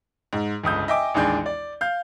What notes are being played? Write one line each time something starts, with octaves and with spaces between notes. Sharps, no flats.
G#2
G1 C#2 D#6 G6
D#5 E5 G5 G#5 D6
A1 D#2 G#3 D4 G#5 G6
D5
F5 G6